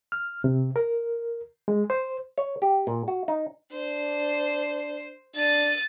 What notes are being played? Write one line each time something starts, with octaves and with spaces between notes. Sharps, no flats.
F6
C3
A#4
G#3
C5
C#5
G4
A#2
F#4
D#4
D4 C5
D4 A6 D#7